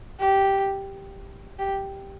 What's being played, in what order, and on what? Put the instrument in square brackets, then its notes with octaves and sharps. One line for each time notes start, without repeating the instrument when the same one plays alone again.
[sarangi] G4
G4